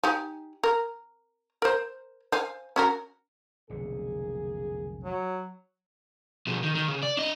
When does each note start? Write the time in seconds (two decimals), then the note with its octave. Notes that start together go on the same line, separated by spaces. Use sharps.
0.03 D#4 G4 G#5
0.63 A#4
1.62 A#4 C5
2.32 C5 F5 G#5
2.76 C#4 F#4 A#4
3.70 F1 B1 D3 A#3 G#4
5.04 F#3
6.47 B2 F3
6.62 D#3
6.75 D#3
6.88 C#3
7.03 D5
7.17 D4 D#5